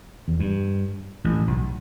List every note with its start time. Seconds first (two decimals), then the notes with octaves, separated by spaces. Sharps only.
0.28 E2
0.40 G2
1.24 A1 A2
1.47 B1 B2